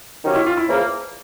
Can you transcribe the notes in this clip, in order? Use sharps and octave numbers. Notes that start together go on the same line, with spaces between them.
C3 D#3 F#3 A#3 C#4 D#4
E4
F4
E4
E2 C#3 F3 A#3